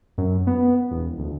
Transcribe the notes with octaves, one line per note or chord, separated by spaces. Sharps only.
F#2
B3
E1
D1